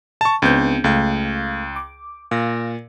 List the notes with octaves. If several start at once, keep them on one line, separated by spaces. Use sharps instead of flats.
A5 C#6
C#2 B3 C4 D4 G6
C#2 A3 F5
D6
A#2 F5 A#6